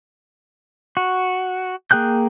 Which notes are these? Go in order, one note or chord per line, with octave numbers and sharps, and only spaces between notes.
F#4
A#3 G#4 G5 F#6 G6